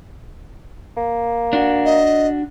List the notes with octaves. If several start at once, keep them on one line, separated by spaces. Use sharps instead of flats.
A#3
D4 F#4
D#5